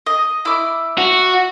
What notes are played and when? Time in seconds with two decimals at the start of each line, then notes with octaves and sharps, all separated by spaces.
0.06 D#5
0.45 E4 D6
0.98 F#4